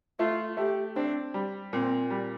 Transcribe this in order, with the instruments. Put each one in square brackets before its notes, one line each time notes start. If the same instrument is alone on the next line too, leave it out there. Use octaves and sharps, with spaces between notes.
[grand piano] A3 [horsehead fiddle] F4
[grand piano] A3 [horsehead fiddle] G4
[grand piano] C4 [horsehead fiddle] D4
[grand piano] G3
[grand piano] A#2 [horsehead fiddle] C4
[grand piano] G3